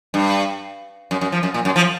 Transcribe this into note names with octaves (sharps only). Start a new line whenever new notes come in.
G2
F#2
F#2
F3
F#2
A#2
F#2
F3